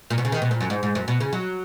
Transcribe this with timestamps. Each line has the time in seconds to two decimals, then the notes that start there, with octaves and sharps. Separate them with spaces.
0.10 A#2
0.18 B2
0.25 C#3
0.32 D#3
0.42 B2
0.51 A#2
0.60 F#2
0.70 G#2
0.83 G#2
0.95 F#2
1.08 B2
1.20 C#3
1.33 F#3